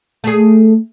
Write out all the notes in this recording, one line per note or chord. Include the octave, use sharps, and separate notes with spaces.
A3 G#4